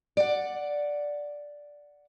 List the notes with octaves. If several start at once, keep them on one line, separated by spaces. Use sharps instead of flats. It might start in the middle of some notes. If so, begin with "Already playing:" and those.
D5 F#5